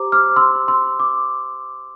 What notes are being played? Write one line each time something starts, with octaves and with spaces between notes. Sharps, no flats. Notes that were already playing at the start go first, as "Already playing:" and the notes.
Already playing: G4 C5 A#5 D6
D6 F6
C6 E6
C6 E6
D6